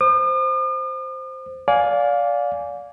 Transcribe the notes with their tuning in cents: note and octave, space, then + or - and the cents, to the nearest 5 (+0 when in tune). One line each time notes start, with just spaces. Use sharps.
C5 +0 D#6 -45
D5 -25 F5 +20 G#5 +0